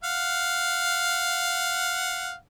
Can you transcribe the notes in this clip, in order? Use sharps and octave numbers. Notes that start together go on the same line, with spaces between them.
F5 F#5